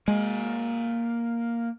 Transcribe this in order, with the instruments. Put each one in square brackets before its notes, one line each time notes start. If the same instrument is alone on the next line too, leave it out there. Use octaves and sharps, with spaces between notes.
[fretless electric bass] G#3 [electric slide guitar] A#3 G#5